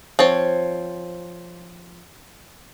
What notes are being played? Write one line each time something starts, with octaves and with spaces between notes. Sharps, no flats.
F3 C4 C#5